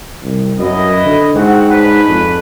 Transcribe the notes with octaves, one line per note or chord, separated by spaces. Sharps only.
C2
F#2 E4 B4 D#5
D3
G#2 C4 F#4 F#5
C#4 D4 B4
F2